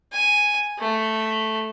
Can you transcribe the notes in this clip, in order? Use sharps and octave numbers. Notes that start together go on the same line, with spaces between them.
G#5
A3